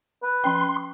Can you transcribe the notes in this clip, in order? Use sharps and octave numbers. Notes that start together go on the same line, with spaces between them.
B4
F3 C#4 G5 C6